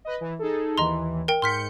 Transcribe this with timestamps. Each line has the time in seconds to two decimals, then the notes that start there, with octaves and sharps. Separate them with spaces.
0.05 B4 D#5
0.21 E3
0.39 D#4 G#4 A4
0.78 D#2 E3 D#5 A#5 C6
1.28 A#4 G5
1.42 G#2 C6 F6 G6 B6 C#7